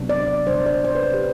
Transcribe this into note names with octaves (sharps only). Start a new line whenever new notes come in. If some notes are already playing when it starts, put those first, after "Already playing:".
Already playing: C3 F#3 B3 D4
D5
C3 G3 D4 C5
D5
C5
B4
G4